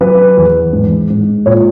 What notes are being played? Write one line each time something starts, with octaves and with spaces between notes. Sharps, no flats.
F#3 B4
E2
G#2
G#2
A#2 C#5